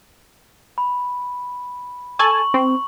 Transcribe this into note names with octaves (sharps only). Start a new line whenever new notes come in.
B5
A4 G#5 A5 C#6 F#7
C4